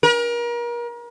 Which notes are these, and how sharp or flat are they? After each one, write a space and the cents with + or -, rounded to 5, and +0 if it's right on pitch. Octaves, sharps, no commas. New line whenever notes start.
A#4 +35